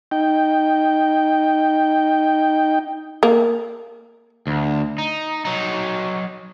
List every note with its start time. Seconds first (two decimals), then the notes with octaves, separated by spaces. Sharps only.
0.11 D#4 G5
3.23 A#3
4.47 D2
4.98 D#4
5.45 F#3 D#4